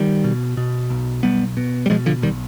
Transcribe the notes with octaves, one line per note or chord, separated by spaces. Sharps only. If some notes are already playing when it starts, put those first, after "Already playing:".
Already playing: D#3 G3
B2
B2
B1
B1 G3 B3
B2
G3
B2 F3 G#3
D3 F3
B1 D#3 G3